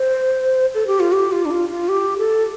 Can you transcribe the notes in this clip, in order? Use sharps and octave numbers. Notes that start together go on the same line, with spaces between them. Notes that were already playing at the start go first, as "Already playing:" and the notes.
Already playing: C5
A4
G4
F4
G4
F4
D4
F4
F4
G4
A4